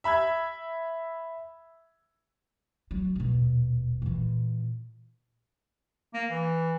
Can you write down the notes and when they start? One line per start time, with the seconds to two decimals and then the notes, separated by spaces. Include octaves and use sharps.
0.04 E5 B5 E6 G#6
2.91 F#3
3.16 D#1 B2
4.02 A#2 E3
6.14 A#3
6.30 E3